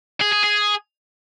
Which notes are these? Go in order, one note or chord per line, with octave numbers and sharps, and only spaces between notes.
G#4
G#4
G#4